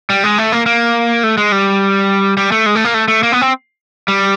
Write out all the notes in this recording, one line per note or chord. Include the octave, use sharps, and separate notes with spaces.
G3
G#3
A3
A#3
A#3
A3
G#3
G3
G3
A3
G#3
A3
A#3
A3
A3
A#3
B3
C4
G3